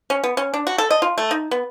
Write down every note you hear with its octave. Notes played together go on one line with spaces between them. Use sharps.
C#4
B3
C#4
D4
F#4
A4
D#5
F4
A3
D#4
B3